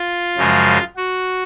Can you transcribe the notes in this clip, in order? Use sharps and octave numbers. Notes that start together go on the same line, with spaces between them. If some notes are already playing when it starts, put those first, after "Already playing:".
Already playing: F4
F#2 C#3 F3 G#3
F#4